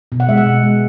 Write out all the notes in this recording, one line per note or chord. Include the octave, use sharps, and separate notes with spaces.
B2
F#5
G#3 E5
F#5
B2
G#3